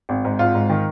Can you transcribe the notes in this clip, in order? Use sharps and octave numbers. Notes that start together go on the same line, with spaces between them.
G#1
G#2
G#1 F4
G#2
D#3